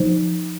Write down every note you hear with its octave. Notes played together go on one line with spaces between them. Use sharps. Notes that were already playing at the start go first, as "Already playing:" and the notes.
Already playing: F3 D#4 C5